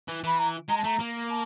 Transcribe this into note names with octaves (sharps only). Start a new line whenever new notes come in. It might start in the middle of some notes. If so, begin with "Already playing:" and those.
E3
E3 B5
A#5
G#3 A#5
A5
A3 A#5
A#3
A5